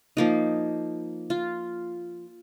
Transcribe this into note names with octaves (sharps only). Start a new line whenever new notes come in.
F3 A#3 D#4
F4